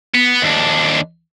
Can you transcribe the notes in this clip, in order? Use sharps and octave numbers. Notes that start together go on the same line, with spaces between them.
B3
D#2 D4